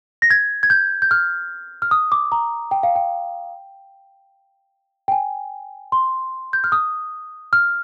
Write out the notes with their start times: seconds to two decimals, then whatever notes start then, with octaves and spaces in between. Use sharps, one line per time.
0.22 A#6
0.31 G#6
0.63 G#6
0.70 G6
1.02 G6
1.11 F6
1.82 F6
1.91 D#6
2.12 D6
2.32 A#5
2.71 G5
2.83 F5
2.96 G5
5.08 G5
5.12 G#5
5.92 C6
6.53 G6
6.64 F6
6.72 D#6
7.53 F6